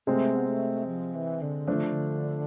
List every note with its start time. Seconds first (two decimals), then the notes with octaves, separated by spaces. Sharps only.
0.07 C3 G#3 A3 C4
0.35 B3
0.47 A3
0.87 F3
1.14 E3
1.41 D3
1.67 E3 F3 A3 D4
1.74 D3
1.89 D3